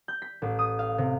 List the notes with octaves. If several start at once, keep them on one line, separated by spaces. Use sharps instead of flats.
G6
B6
A1
D#6
F5
C3